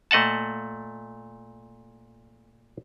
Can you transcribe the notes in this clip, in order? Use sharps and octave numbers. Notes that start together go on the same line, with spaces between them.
A#2 A3 D#5 F#5 A5